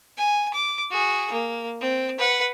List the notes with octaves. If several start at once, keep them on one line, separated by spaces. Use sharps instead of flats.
G#5
D6
F#4 G#4
A#3
C4
B4 F#5